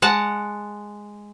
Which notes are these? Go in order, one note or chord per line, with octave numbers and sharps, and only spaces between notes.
G#3 F#5 A5